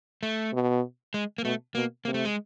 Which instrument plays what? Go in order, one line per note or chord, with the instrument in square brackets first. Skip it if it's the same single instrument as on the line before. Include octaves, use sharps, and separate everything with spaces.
[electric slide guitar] A3
[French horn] B2
[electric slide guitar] G#3
A#3
[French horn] B2 [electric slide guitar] A3
[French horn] B2 [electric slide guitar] A#3
[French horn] C3 [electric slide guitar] A#3
[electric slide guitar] A3
G#3